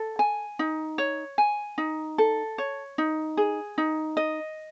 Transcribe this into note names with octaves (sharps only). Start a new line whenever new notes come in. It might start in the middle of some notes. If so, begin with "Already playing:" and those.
Already playing: A4
G#5
D#4
C#5
G#5
D#4
A4
C#5
D#4
G#4
D#4
D#5